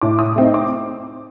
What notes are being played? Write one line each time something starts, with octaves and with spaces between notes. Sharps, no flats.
A2 D6
D#6
A3 C4 D#4
D6